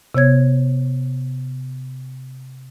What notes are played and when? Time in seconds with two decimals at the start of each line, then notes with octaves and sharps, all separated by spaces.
0.15 C3 B3 C#5 G#6